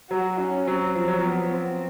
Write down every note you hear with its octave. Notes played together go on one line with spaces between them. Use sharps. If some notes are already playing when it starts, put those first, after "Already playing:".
F#3 F#4
C#4
F#3 C4
F3
F#3
F3 B3
C4